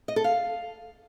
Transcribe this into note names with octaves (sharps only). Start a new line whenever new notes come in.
D#5
A4
F5